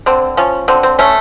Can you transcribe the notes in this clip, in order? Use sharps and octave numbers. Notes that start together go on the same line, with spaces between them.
D3 C4
F3 C#4
D3 C4
C4
A3 C#4